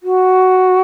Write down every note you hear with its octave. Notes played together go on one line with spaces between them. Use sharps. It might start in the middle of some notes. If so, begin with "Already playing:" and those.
F#4